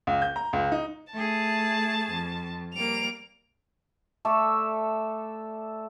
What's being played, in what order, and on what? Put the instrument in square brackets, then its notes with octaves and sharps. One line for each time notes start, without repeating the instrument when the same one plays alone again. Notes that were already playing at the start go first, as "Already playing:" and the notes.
[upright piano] C#2
G6
A#5
C#2
D#4
[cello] A3 G#4 [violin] A5
[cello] F2
[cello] G3 A#3 [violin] D7 F7
[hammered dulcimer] A3 A4 D5 E5